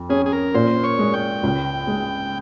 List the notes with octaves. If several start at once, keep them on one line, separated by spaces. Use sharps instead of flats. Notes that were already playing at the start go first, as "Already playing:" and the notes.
Already playing: F2
C#4 G#4
G#4
A#4
A#2 C5
C#5
G#3
G5
C#2
G#3